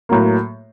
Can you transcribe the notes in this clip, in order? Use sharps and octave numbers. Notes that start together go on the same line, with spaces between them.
A2 F#3 A#3